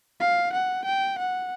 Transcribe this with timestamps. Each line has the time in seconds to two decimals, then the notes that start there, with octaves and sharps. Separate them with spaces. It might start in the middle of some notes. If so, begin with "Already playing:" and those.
0.20 F5
0.53 F#5
0.85 G5
1.19 F#5